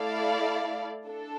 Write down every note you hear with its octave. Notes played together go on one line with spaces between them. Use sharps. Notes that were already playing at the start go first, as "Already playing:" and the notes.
Already playing: A3 E4 A4 D5 F5
D4 A4